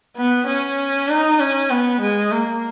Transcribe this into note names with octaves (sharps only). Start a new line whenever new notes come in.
B3
C#4
D#4
C#4
B3
G#3
A#3